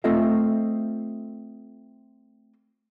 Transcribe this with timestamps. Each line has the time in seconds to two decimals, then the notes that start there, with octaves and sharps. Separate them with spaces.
0.04 A3 C4 F4 A4 D#5 E5